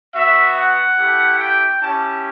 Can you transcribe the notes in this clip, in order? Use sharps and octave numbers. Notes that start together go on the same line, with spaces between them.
B3 F#4 E5
F#5
A3 E4 G4
G5
C#4 E4 G4 A5